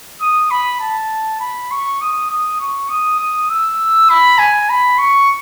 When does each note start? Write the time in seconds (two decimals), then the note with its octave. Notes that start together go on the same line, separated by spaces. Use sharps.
0.21 D#6
0.51 B5
0.81 A5
1.41 B5
1.71 C#6
2.01 D#6
2.30 D#6
2.60 C#6
2.90 D#6
3.20 D#6
3.50 E6
4.10 B5
4.39 G#5
4.70 B5
4.98 C#6